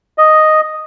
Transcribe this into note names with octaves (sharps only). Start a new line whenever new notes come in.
D#5